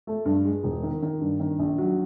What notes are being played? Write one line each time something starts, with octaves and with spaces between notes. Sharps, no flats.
A3
G2
G#3
E1
D#3
D#3
G2
D#3
A#1
F#3